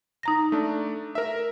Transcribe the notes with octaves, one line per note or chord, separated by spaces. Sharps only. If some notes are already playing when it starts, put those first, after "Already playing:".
D#4 A#5 A#6
A3 D4
A#4 E5